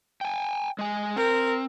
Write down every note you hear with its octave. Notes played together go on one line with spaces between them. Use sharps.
G5 G#5
G#3 G#5
C4 A#4